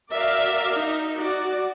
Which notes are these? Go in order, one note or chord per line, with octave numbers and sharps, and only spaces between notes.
F#4 A#4 D5 E5 F5
D#4
F#4 D5